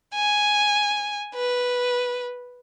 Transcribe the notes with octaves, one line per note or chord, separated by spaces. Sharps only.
G#5
B4